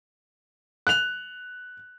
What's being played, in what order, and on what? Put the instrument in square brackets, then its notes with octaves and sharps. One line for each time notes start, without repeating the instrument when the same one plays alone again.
[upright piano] F#6 F7